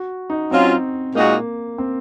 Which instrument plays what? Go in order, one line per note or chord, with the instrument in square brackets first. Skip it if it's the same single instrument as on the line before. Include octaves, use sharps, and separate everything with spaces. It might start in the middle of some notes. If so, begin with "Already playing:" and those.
Already playing: [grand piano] F#4
D#4
[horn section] F#3 C#4 F4 [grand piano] C4
[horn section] A#2 G#3 D#4 F#4 [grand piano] A#3
[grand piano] C4